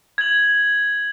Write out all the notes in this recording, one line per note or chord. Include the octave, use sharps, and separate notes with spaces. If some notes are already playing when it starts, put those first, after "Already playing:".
G#6 F#7